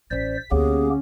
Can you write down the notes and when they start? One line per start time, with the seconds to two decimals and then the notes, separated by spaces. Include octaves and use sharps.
0.11 A1 C#4 C5 D5 B6
0.51 D2 A#3 B3 C#4 G4 G#4